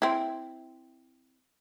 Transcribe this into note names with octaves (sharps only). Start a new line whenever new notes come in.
C4 E4